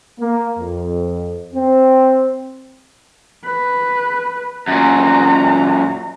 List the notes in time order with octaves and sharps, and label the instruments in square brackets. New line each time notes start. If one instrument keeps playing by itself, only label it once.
[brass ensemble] A#3
F2
C4
[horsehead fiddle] B4
[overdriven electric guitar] F#2 A#2 [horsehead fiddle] A#5